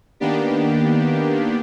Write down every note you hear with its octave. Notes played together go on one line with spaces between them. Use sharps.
D#3 A#3 B3 D4 G4